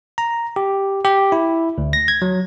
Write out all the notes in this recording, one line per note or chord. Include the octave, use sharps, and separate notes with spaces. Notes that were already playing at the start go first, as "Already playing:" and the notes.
A#5
G4
G4
E4
D2
A#6
G#6
F#3